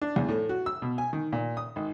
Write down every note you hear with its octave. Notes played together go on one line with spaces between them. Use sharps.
D4
E2
A2
F#4
E6
B2
G#5
D#3
A#2
D#6
G#1